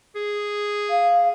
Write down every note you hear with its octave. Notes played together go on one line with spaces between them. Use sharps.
G#4
F5